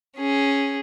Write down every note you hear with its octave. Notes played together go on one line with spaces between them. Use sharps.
C#4 G#4